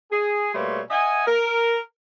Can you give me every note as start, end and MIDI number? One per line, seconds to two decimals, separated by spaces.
0.11 0.51 68
0.54 0.81 47
0.54 0.81 55
0.54 0.81 57
0.54 0.81 58
0.54 0.81 73
0.54 0.81 84
0.90 1.22 75
0.90 1.22 76
0.90 1.22 78
0.90 1.22 80
1.27 1.78 70